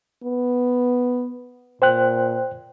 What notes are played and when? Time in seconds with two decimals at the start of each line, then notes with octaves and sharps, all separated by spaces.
0.24 B3
1.82 A#2 C5 G5 F#6